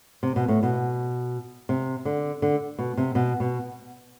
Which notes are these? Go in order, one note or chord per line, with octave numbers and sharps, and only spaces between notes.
C3
B2
A2
B2
C3
D3
D3
B2
C3
B2
B2